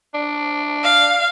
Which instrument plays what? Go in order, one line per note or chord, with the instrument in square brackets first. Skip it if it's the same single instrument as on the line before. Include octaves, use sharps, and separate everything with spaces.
[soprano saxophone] D4
[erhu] F5